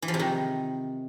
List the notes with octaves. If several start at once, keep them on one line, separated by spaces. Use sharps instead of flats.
E3
F3
C3
D#3